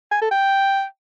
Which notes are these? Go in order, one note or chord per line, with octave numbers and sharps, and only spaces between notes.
G#5
A4
G5